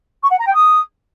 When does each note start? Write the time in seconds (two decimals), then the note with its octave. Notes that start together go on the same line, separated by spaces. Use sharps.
0.22 C#6
0.30 F#5
0.38 A#5
0.46 G5
0.54 D#6